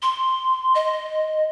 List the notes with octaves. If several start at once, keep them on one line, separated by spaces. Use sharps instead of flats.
C6
D#5